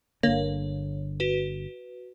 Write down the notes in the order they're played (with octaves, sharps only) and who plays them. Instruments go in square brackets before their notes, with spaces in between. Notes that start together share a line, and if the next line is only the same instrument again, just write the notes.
[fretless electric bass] G1 D3 [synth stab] A#3 [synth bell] C#5
[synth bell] F#4 B4